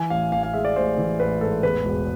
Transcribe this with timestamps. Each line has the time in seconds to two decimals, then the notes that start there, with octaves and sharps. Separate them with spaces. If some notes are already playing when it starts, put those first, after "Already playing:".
Already playing: E3 G#5
0.10 A1 F5
0.32 A1 F5
0.43 F5
0.54 G#3 E5
0.65 D5
0.76 A1 C5
0.98 E3
1.20 A1 B4
1.41 G#2 A4
1.63 E2 B4
1.85 E1